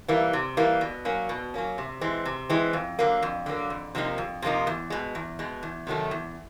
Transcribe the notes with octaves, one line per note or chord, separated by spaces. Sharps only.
E3 G3 A#3
C3
E3 G3 A#3
B2
F#3 A#3 C#4
B2
F#3 A#3 C#4
C3
E3 G#3 C4
C3
E3 G#3 C4
F2
D3 F#3 A#3
F2
D3 F#3 A#3
F2
C3 F3 A#3 D#4
F2
C3 F3 A#3 D#4
E2
B2 G#3
E2
B2 G#3
E2
C3 D#3 F#3 A3
E2